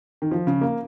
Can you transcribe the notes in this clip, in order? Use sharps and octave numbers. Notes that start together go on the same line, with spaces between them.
D#3
F3
C#3
A#3